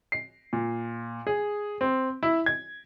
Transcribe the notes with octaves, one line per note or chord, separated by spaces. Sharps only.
C7
A#2
G#4
C4
E4
G#6